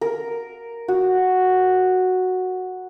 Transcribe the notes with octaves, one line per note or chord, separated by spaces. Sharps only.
A#4
F#4